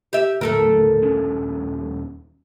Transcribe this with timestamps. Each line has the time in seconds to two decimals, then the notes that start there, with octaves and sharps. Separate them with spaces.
0.13 G4 E5
0.41 D#1 A2 D3 A3 A4 A#4
1.02 D#1 C#4 D4